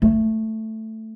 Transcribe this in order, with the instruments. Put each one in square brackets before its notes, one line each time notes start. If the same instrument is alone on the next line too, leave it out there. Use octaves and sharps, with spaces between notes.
[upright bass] A3